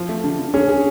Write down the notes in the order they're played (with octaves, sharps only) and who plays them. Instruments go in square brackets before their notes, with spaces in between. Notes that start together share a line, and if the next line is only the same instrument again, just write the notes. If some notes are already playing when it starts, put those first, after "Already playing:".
Already playing: [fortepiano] F3
A3
D3
D3
[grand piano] C#4 [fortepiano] G#4
[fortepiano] G#4